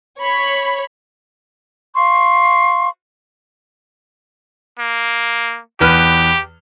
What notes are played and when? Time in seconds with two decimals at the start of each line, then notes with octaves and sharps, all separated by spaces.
0.19 C#5 B5
1.95 F5 C6 C#6
4.79 A#3
5.80 E2 G4 B4 F6